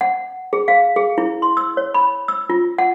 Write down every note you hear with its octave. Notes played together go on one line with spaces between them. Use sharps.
F#5
G#4
F5
G#4
E4
C6
E6
C#5
B5
E6
F4
F#5